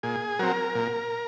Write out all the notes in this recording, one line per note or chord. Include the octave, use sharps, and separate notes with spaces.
A#2 G#4
F#3 C4 A#4
A#2